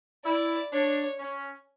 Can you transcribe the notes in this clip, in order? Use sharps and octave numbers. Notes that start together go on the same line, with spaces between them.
E4 D5
D4 C#5
C#4